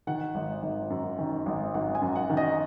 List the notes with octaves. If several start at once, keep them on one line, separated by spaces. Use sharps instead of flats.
D#3 F#5
G#1
G#1
F#2
D#3
G#1
G#1 F#5
G#5
F#2
F#5
D#3
D#5